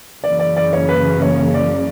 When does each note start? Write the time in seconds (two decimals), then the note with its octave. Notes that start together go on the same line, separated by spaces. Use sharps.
0.24 F#2 C#3 E3 A#3 D5
0.40 D5
0.57 D5
0.73 C#5
0.89 B4
1.22 C#5
1.54 D5